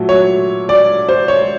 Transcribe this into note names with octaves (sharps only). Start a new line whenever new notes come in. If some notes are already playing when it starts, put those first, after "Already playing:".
Already playing: A#2 F#3 A3
C#5
D5
C5
C#5